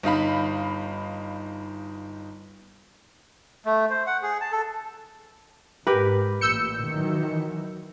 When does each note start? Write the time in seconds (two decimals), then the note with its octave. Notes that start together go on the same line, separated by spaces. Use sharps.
0.03 G1 D#4 F5 B5
3.66 A3
3.90 C5
4.07 F#5
4.22 G#4
4.41 A5
4.52 A4
5.87 G#2 G4 A#4 B4
6.41 A1 A#2 E6 G6 C#7
6.89 D#3 E3 F#3